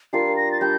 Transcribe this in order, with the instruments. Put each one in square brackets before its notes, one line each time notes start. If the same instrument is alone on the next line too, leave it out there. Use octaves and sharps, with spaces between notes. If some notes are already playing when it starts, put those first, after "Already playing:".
[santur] G3 D4 F4 A#4 [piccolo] C7
[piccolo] A#6
A6
[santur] G3 D4 [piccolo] G6